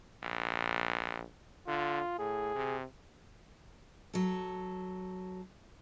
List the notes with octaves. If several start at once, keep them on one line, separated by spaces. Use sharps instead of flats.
A#1
D3 F4
A2 G#4
C3
F#3 A4